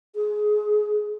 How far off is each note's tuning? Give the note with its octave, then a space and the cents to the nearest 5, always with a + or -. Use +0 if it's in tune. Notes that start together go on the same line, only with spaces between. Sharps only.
G#4 +20